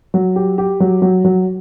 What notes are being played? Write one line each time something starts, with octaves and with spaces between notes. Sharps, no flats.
F#3
G4
G4
F#3
F#3
F#3